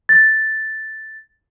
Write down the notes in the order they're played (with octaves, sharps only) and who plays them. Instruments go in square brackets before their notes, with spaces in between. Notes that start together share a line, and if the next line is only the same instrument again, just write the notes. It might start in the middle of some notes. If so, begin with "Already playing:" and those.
[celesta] A6